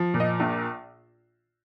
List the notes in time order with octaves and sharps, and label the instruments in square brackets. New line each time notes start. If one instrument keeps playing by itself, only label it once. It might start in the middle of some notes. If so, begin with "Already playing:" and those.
Already playing: [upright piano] F3
A#2
D#5
A#1